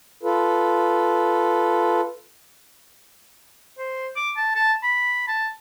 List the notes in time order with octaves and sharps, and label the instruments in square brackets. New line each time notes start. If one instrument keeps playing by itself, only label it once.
[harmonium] F4 A4 B4
[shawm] C5
D6
A5
A5
B5
A5